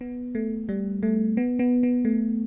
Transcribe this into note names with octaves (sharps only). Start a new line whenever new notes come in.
B3
A3
G3
A3
B3
B3
B3
A3